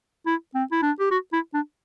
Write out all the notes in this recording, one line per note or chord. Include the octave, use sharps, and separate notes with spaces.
E4
C4
E4
D4
G4
F#4
E4
D4